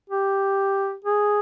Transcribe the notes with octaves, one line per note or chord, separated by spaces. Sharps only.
G4
G#4